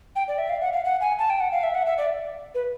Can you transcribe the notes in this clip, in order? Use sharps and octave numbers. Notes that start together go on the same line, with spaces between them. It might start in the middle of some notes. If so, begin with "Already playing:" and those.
G5
D5
E5
F5
F#5
F5
F#5
G#5
A5
G5
F#5
F5
E5
F#5
E5
D5
B4